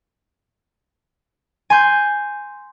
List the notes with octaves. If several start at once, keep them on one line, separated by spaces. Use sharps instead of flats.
G#5 C6 G6